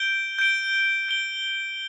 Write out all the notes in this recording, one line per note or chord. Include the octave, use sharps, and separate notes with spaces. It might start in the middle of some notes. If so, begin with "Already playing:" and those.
Already playing: G6 D7 G7
G6 D7 G7
G6 D7 G7